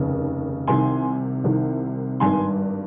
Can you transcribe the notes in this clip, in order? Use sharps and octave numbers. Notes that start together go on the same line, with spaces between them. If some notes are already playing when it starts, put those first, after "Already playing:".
Already playing: F1 D#2 C#3
C2 C3 D#3 G#5 C6
C2 C3 D#3
G#1 G2 D#3 G#5 C6